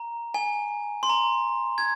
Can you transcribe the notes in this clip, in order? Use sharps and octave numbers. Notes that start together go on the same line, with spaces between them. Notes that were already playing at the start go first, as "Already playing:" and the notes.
Already playing: A#5
G#5
C6
A#5
G#6